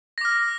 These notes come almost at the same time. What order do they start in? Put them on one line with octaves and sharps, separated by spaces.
A#6 D6 F6